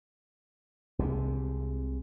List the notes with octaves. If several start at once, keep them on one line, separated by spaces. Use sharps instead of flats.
C2 C3 G#3